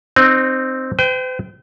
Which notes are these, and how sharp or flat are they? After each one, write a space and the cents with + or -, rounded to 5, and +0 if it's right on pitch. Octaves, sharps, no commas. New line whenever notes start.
C4 +0 D#4 -20
C5 -45 G5 +0